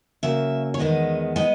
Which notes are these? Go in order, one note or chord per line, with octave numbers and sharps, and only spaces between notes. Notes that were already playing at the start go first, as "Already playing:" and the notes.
C#3 F#3 A#3 E5
C#5
E2 D#3 G#3 B3 D#5
D#3 G#3 B3 D#5